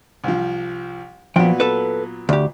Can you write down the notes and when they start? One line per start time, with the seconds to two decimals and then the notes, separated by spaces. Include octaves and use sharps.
0.24 C2 F3
1.36 A#2 F3 F#3 B3 G5
1.60 A4 B4
2.29 D2 G4